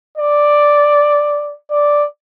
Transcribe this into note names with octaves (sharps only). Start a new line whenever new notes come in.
D5
D5